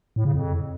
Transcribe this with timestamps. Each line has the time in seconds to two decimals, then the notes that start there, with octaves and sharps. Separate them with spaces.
0.16 A2
0.25 C#3
0.34 F2